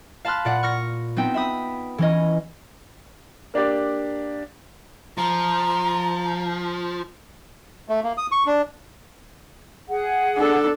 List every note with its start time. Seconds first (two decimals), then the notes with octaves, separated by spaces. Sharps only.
0.25 F5 A5 B5 C6 F6 F#6
0.45 A#2 D5 F#5
0.63 C#6 F6 A#6 C#7
1.17 B3 C4 D#4 G5
1.34 E5 B5 D#6
1.98 E3 C#4 D#5
3.54 A#3 D4 G4 D5
5.18 F3 A#5
7.89 A3
8.04 A#3
8.18 D#6
8.32 C#6
8.46 D4
9.89 G#4 F#5
10.37 D4 A4